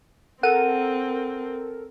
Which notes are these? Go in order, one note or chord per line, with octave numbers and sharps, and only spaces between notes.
C4 A4 A#4 F#5 D#7